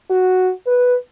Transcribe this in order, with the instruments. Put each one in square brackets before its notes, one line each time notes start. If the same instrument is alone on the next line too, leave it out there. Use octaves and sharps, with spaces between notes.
[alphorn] F#4
B4